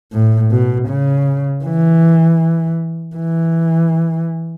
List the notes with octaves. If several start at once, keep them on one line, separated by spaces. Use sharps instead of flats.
A2
B2
C#3
E3
E3